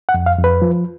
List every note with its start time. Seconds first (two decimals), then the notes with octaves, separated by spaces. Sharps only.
0.09 F#5
0.14 F2
0.26 F5
0.38 F2
0.44 B4
0.62 F3